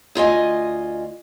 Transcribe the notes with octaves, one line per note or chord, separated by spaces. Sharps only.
D2 F4 D#5 G#5